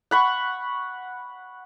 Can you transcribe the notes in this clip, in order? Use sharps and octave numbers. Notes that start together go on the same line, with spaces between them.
F#5 B5 C#6